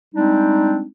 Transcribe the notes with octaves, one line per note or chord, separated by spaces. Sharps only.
G3 G#3 C4 D4 D#4